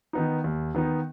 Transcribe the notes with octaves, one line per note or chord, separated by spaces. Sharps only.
D#3 B3 D#4
D#2
D#3 B3 D#4